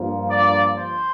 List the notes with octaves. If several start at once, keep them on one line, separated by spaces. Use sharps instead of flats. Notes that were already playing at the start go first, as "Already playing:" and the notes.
Already playing: G2 F3 A#3
D5
C5